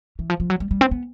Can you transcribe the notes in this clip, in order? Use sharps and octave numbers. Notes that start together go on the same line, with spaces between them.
E3
F3
F3
F#3
G3
G3
C4
B3